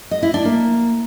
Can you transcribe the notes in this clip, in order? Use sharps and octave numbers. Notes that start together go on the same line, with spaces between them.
D#5
E4
D4
A#3